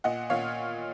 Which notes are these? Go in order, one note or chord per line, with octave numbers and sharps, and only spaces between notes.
A#2 D#5 F#5
A#2 C#5 F5